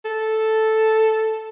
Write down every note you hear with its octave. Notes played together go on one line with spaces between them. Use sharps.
A4